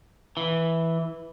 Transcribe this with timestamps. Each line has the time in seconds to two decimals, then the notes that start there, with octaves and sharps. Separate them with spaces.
0.37 E3